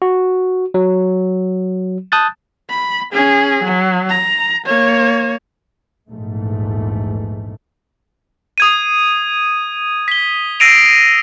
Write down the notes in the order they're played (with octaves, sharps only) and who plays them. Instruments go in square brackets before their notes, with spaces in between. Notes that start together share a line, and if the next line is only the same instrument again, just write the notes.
[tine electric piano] F#4
F#3
A5 D#6 F#6 G6 A6
[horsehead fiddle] B5
C#4 G#4
F#3
A#5
A#3 C#5
[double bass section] A#1 E2 G#2 A3
[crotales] D#6 G#6 D#7
B6 G7
E6 A#6 C7 D7 D#7 F7